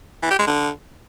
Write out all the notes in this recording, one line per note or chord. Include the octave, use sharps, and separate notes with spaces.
E3
G4
G#3
D3